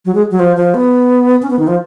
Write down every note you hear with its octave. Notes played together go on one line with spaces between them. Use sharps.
F#3
G#3
F#3
F3
F3
B3
C#4
B3
D#3
F3